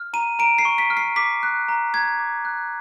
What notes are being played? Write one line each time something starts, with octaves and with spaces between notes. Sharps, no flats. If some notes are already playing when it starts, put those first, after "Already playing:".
Already playing: F6
A#5 D#7
A#5 D7
C7
C#6
B6
F6
C7
D6 B6
F#6
A#5
A#5 G#6
D6
F#6